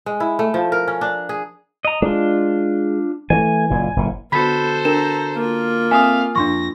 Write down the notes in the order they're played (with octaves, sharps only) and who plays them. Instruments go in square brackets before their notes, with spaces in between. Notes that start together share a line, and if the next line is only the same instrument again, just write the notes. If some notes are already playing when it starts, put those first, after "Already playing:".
[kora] G#3
E4
A3
F3
A#4
C#4
D4
G#4
[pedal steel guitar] D#5 A#5
[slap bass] G#3 [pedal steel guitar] D4 F4
[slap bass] E3 G3 A3 [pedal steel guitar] G#5
[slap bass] F#1 A#2
F#1 A2
[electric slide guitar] D3 F#4 [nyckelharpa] B3 [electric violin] A4 C5 [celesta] B5 B6
[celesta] D4 A#4 E7 [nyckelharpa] A#5
[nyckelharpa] A#3 F4
[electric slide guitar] C4 A4 E5 [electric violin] F5 [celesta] G#5 D#6
[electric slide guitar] F2 A2 F3 [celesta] D4 C6 C#6 [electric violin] A#6